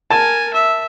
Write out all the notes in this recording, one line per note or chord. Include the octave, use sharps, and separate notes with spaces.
A#4 G#5 A5
E5